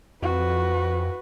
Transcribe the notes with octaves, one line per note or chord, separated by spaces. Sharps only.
F2 F#4 B4